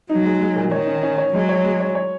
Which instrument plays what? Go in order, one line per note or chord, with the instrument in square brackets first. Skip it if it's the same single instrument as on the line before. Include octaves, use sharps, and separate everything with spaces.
[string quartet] F#3 [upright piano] D#4
[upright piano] G#3
G#3
A#2
[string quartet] D#3 [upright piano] C#5
[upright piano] C#4
C#4
C#5
[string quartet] F#3 [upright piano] G#3
[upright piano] C#5
G#3
C#5
C#5